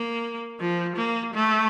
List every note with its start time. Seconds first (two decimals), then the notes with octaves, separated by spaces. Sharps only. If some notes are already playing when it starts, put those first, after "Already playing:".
Already playing: A#3
0.60 F3
0.97 A#3
1.34 A3